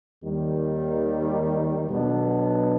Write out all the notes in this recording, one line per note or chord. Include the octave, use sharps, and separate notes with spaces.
D#2 D#3 G3
B1 B2 F#3 B3 D4